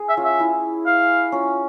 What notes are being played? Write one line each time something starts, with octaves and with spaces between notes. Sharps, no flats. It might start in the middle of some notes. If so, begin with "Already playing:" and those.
Already playing: G#4
E5
C#4 F4
E5
E4
F5
C#4 F4